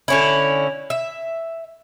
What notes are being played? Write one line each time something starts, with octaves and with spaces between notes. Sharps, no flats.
D3 C#4 E4
E5